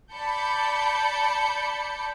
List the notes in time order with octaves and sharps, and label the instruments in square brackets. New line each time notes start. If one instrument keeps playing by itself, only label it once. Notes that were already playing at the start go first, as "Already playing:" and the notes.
[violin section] D5 A5 B5 G6 C#7